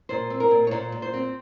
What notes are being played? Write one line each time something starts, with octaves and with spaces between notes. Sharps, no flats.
A#2 C5
C4
A#4
A#2
C#5
A#2 C5
A#2
C5
C4